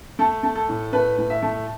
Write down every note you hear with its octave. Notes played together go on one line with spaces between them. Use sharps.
A3 A4
A3
A4
A2
A3 B4
A2
E5
A3